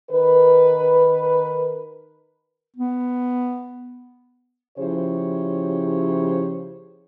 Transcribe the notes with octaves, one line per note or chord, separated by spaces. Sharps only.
D#3 A#4 B4
B3
C#3 F3 E4 G4 C5 C#5